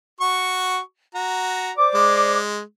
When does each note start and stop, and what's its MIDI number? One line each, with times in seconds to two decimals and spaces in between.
0.21 0.79 66
0.21 0.79 85
1.15 1.72 66
1.15 1.72 82
1.77 2.39 72
1.77 2.39 74
1.77 2.39 86
1.95 2.61 56